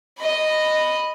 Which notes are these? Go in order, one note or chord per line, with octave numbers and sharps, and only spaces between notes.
D#5 B5